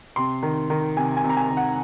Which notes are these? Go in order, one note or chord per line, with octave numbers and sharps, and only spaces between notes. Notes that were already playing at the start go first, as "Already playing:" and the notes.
C3 C6
D#3
D#3
C3 G#5
G#5
C3
A#5
G#5
D#3
F#5